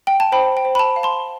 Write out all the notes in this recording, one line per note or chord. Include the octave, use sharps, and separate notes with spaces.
G5
A5
C5 G5 B5
G5
C5
B5
A5
F5
A5 C6